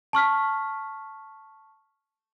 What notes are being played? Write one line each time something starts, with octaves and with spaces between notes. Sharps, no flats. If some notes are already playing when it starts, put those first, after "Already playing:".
A5 C#6 F6 B6